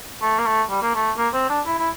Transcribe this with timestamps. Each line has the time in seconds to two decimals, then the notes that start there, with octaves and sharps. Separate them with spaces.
0.22 A3
0.39 A#3
0.46 A3
0.70 G3
0.82 A#3
0.95 A3
1.18 A#3
1.34 C4
1.50 D4
1.66 E4
1.79 E4